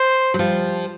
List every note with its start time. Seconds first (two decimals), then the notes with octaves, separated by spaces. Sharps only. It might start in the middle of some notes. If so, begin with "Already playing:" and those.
Already playing: C5
0.34 F#3
0.39 F3 G3